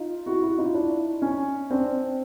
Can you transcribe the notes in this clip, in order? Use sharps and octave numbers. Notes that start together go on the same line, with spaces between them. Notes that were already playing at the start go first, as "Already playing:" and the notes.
Already playing: D#4 F4
E4 F#4
E4 F#4
D#4 F4
D4 E4
C#4 D#4
C4 D4